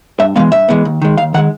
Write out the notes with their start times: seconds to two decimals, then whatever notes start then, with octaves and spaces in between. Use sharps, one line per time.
0.20 G2 E5
0.36 E3 G#3 B3 F5
0.52 G2 E5
0.68 E3 G#3 B3
0.85 D#2
1.02 D#3 G#3
1.17 D#2 F5
1.34 D#3 F#5
1.38 G#3